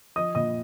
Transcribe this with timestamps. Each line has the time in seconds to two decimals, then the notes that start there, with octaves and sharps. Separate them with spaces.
0.16 F3 D#5 D#6
0.35 A#2 D#5 D#6